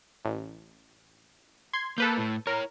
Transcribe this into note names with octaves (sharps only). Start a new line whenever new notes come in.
A1
C6 G#6
A#3 A4 B4 G6
A2
E4 A#4 C#5